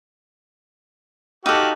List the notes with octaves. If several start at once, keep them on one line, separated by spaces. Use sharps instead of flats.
D#4 F#4 G4 A4 F5